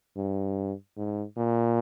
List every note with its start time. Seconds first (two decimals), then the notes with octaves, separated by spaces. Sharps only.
0.17 G2
0.97 G#2
1.37 A#2